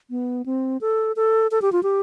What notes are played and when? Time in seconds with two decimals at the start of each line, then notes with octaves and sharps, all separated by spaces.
0.10 B3
0.46 C4
0.81 A4
1.16 A4
1.51 A4
1.62 G4
1.72 F4
1.83 G4